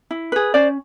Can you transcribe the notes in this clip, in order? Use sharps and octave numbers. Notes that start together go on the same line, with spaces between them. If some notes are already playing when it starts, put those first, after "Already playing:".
E4
G#4 B4
C#4 C5 D5